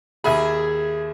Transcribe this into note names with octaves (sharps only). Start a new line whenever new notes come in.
D#2 G#4 E5 B5